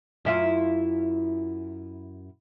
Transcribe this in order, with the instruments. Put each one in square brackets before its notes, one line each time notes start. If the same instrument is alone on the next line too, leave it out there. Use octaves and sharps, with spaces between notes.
[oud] F#2 E4 F4